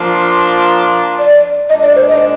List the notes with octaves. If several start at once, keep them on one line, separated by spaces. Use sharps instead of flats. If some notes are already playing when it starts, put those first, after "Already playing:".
Already playing: F3 A#3 D4 F4
D5
A#2 G#3 D4 D#5
D5
C5
D#5